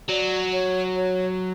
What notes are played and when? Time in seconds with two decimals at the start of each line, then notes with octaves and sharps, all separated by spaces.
0.09 F#3 D5
0.53 C#5
0.96 C#5